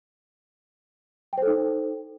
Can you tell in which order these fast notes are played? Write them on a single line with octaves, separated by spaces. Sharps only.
G5 C5 A4 D#4